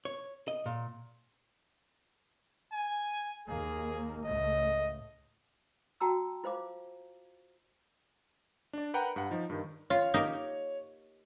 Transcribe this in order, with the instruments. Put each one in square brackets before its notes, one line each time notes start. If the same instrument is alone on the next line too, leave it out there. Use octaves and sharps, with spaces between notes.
[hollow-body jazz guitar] C#5
D#5
A#2
[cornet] G#5
[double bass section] D#2 A#3 [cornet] G#4
[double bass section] C#2 A2 A3 [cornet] D#5
[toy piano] F#4 G5 A5 A#5 E6
F4 C5 F5 D6
[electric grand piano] D4 D5
A#4 B4 F#5 G5 A#5 B5
G2 F#5
F3 D#4
G2 D#3
[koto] F4 [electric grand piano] C#5
[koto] A#3 D#4 G4